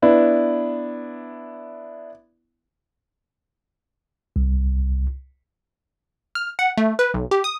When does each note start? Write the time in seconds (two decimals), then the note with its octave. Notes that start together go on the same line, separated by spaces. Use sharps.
0.02 B3 D4 E4
4.36 C2
6.35 F6
6.59 F#5
6.78 A3
6.99 B4
7.14 B1
7.31 G4
7.44 D#6